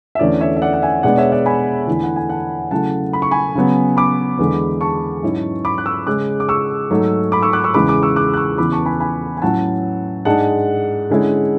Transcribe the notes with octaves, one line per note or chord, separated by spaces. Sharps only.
E5
E2 D3 A3 C#4 D5
C#5 E5
E5
D5 F#5
F#5
E5 G#5
B2 G#3 B3 D4 D5 F#5
C#5 E5
D5 F#5
G#5 B5
E2 D3 A3 E4
F#5
G#5
F#5 A5
C#3 F#3 A3 E4 F#5 A5
B5
C#6
G#5 B5
C#3 F#3 B3
B5 D6
E2 D3 G#3
A5 C#6
G#2 F#3 C#4 E4
B5 D6
F#6
C#6 E6
C#3 G#3 C#4 D6 F#6
D6
C#6 E6
G#2 F#3 A3
B5 D6
C#6 E6
D6 F#6
C#6 E6
E2 C#3 G#3 B5 D6
B5 D6
C#6 E6
D6 F#6
F#6
C#6 E6
E2 C#3 E3 B3 B5 D6
A5 C#6
G#5 B5
G#5 B5
G#5
A2 F#3 C#4 E4 F#5 A5
G#2 G#3 D4 F#5 A5
D3 G#3 C#4 E4